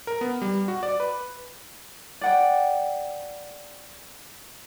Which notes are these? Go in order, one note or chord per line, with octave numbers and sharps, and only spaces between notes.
A#4
B3
G3
F#4
D5
B4
D5 F#5 G5